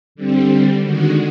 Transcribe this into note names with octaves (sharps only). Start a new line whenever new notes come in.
D3 G3 C4
D3 D#3 G#3 F#4